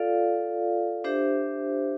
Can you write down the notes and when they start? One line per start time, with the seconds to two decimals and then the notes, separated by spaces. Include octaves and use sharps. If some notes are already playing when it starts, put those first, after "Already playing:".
Already playing: F4 A4 D5 F5
1.04 D4 G4 C5 E5